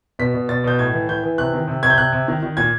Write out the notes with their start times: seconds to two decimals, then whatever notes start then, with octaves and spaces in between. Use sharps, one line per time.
0.19 B2 B6
0.34 B2
0.49 B2 A6
0.64 B2 G6
0.79 A2 G#6
0.93 E3
1.08 E3 G6
1.23 E3
1.38 C3 F#6
1.53 D#3
1.68 C3
1.83 C3 G#6
1.90 G6
1.97 C3 F#6
2.12 C3
2.28 D#3
2.43 D#3
2.57 A#2 G#6